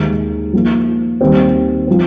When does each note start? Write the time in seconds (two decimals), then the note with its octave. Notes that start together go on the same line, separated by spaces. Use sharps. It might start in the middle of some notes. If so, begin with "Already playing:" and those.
Already playing: D#2 D#3 G#3 D#4
0.53 F3 A#3 F4
1.21 D#2 D#3 G3 C4
1.87 F3 C4